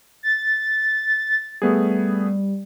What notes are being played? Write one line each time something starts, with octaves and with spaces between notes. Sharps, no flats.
A6
G3 A3 B3 G#4